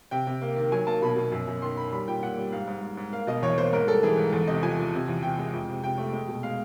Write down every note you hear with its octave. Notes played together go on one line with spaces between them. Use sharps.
C3 G5
C3
A#3
D#3
F#3 G#5
A#3 A5
B2 B5
B2
F#2
F#2
D#3 C6
D#3 B5
G3 B5
A#2 G5
A#2 F#5
G3
G#2 F5
G#2
G#2
G#2
A#3 F5
B2 D#5
E2 C#5
A#3 C5
G#2 A#4
G3 A4
E3 G#4
G#2
E2 A4
C3 D#5
F3 G#5
F3
C3
E2
C3 G5
G#3
F2
C3
C3 G5
A3
G#3
B2
G#3 F5